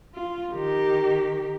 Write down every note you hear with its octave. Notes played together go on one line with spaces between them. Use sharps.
F4
D#3 G4